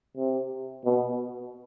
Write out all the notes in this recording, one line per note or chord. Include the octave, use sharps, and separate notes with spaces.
C3
B2